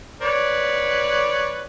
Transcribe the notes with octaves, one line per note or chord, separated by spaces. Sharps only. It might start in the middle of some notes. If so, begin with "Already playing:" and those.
B4 C#5 D5